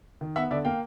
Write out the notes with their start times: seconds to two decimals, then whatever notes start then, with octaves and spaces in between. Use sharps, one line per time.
0.21 D#3
0.36 B3 E5 F#5
0.51 D3 D5 E5
0.65 A#3 F5 G5